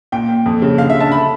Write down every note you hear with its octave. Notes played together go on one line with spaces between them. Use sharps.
A#2 G5
A#2
F2
C#3
D3 F5
E5
D3
A5
A3 B5